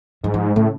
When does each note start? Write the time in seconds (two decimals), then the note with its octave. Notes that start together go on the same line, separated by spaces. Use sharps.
0.23 G#2 F3
0.34 F3
0.56 A2 C#3